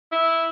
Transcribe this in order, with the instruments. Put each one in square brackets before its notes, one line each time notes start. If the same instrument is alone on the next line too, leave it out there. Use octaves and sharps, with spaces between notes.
[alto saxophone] E4